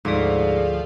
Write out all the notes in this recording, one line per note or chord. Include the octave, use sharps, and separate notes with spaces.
D2 G#2 F3 G#4 D5 E6 B6